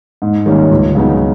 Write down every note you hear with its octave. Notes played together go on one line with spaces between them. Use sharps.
G#2
D#3 G3 A#3 C#4
C#2
C#3 F#3 B3 D#4